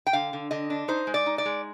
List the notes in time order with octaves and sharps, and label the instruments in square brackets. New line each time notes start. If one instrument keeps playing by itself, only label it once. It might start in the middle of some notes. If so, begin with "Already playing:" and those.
[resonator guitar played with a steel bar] G5
D3 F5
D3
D3 D#5
D4
D#4 C5
G#3
D5
D#4
D5
G#3